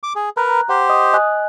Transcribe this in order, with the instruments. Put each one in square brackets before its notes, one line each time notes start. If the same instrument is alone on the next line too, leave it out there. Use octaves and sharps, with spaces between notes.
[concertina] D6
G#4
[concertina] A#4 B4 [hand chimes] A#5 F#6
[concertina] G4 C5 [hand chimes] F#5
[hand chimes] D#5 D#6
D#5 G#5 F#6